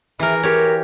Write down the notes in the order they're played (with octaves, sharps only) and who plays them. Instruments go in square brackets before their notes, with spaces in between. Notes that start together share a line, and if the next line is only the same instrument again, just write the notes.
[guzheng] E3 A#4 [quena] E5
[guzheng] G4 C#5 [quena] A#4